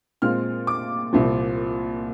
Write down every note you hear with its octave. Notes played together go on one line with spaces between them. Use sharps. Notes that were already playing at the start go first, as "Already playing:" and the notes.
A#2 G#3 C4 F4 F6
D6
C2 A#2 F3